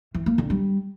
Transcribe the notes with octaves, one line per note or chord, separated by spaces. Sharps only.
E3
A#3
D3
G3